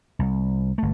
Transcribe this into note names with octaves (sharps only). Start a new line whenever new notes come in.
C2
G1 A3